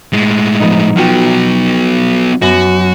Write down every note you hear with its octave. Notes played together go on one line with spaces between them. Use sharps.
A2 G#3
F3 B3 D#4
F#3 B3 F4 F#4 G5
F#2 B3 F#4